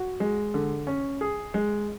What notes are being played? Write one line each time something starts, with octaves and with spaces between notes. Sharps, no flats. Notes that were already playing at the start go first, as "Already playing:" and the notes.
Already playing: F#4
G#3
D3
C#4
G#4
G#3